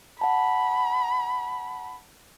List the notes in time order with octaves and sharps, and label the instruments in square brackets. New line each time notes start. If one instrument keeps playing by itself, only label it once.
[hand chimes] F#5 A5 [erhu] B5